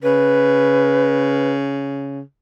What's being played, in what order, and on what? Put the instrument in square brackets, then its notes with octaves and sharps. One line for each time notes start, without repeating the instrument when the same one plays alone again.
[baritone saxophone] C#3 [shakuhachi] B4